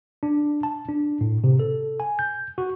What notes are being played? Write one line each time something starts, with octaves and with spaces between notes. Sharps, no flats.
D4
A5
D4
A2
C3
A4
G#5
G6
F#4